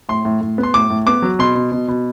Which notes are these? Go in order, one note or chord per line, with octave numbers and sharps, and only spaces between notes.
A2 C6
A2
A2
B3
C6
A2 D6
A2
B3 D6
F#3
B2 C6
B2
B2
B2